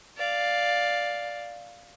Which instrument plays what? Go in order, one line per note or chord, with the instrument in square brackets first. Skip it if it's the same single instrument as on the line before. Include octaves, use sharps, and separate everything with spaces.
[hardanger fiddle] D5 F5